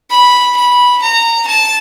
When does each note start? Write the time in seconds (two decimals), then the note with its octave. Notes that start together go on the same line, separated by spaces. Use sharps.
0.10 B5
0.56 B5
1.01 A#5
1.47 A5